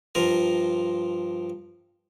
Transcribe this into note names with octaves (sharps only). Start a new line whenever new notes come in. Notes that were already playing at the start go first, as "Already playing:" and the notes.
G2 F3 F4 A#4